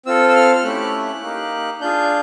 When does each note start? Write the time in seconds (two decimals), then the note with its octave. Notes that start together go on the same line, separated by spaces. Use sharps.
0.06 C4 F4 A4 E6
0.29 E6
0.35 F6
0.56 F6
0.64 A3 C#4 E4 G4 F#6
1.22 A#3 D#4 G4
1.81 D4 F4 G#4 G6